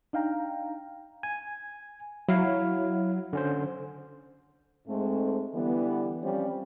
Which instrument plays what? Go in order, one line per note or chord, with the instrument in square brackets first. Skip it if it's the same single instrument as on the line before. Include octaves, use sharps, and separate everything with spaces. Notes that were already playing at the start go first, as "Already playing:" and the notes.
[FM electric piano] D4 D#4 F5 G5 A#5
[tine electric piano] G#5
[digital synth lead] F#3 [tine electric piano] E4 F5
[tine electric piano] D3 C#4 C5
[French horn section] G#2 G#3 A3 C4 A4
D3 E3 G3 B3
F3 G3 C4 C#4